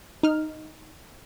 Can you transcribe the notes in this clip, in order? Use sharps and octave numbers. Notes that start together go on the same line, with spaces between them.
D#4 F6